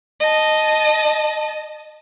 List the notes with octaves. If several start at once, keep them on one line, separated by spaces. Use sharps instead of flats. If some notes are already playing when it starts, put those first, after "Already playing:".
D#5 A5